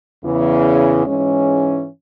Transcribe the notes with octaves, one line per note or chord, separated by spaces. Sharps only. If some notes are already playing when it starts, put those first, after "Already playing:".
E2 C#3 E3
G#2 E3 G#3 C#4